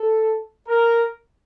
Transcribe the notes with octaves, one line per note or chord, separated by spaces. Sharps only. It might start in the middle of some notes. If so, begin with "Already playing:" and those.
Already playing: A4
A#4